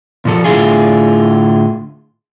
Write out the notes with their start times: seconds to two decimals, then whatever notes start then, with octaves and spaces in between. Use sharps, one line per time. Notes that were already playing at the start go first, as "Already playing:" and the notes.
0.25 A#2 F3 A4
0.44 A2 D3 E4 F4 G#4